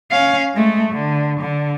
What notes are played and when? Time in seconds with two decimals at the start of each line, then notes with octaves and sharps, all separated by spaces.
0.11 C#4 F5
0.54 G#3 A3
0.92 D3
1.40 D3